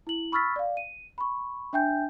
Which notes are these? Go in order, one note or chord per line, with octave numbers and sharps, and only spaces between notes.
E4 F#7
B5 C#6 E6 F6 A6 B6
D5 F5
D#7
B5 C#6
D4 E5 G5 G#5 G6